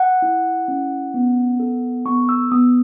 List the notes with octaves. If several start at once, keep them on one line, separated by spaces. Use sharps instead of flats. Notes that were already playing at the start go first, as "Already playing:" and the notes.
Already playing: F#5
E4
C#4
B3
A4
B3 C#6
E6
B3 D#6